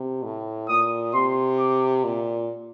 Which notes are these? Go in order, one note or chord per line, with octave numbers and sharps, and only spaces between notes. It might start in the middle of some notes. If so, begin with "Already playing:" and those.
Already playing: C3
A2
A#2 D#6
C3 C6
D6
A#2